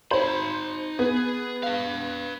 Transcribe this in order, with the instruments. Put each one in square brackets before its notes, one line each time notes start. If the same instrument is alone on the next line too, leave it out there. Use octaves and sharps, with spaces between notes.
[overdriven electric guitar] D#4 B5 [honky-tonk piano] C5
[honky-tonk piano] B3 [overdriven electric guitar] G#4
[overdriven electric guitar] B4 F5